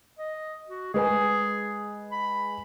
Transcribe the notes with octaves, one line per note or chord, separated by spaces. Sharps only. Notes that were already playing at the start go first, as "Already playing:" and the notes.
D#5
F#4
G#3 G#4 B4 G#5
B5